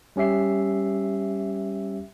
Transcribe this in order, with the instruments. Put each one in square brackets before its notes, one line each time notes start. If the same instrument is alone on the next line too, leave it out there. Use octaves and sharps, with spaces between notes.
[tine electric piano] G3 C#4 G4 E5 C7